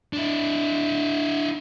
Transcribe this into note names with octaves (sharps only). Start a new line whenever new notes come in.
D4 E4